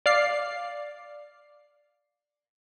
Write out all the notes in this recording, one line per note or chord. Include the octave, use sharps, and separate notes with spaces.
D5 F5 C7